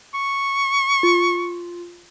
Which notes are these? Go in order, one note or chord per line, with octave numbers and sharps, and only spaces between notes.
C#6
F4